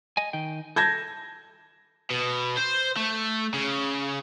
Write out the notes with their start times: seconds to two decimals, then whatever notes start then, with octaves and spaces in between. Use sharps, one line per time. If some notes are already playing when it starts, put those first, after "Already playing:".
0.17 D#5 G#5
0.33 D#3 G5
0.76 A4 A5 G6 G#6 A#6
2.11 B2
2.57 C5
2.97 A3
3.54 C#3